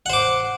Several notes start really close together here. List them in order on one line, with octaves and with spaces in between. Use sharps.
F#5 C5 D6